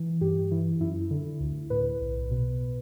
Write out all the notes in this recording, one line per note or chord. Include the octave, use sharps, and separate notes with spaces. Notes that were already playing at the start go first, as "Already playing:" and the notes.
Already playing: E3
G2 G4
E3 E4
F#2 E4
D3
D2
A2 B4
B1
B2